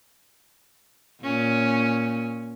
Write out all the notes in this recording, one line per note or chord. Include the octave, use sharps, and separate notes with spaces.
A#2 C#4